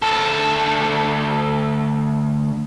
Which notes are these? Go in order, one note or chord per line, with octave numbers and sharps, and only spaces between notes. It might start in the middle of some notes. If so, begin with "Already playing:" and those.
D2 A4